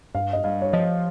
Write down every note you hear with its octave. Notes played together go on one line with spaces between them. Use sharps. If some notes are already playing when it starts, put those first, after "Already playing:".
G2 F5
D#5
G2 F5
C#5
F3 D#5